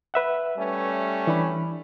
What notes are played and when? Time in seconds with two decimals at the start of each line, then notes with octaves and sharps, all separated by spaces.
0.14 B4 E5 F#5
0.57 G3 A3 C#4
1.27 E3 D4 B5